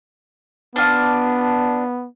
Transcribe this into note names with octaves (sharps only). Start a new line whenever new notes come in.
B3 D4 F4 A5